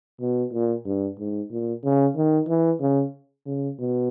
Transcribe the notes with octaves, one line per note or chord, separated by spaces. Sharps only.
B2
A#2
G2
G#2
A#2
C#3
D#3
E3
C#3
C#3
B2